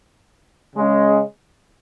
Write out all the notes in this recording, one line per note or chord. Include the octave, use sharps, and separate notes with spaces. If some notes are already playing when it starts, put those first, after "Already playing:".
C#3 G#3 C#4